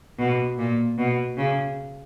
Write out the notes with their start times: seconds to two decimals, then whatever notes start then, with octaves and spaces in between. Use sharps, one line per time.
0.19 B2
0.58 A#2
0.98 B2
1.37 C#3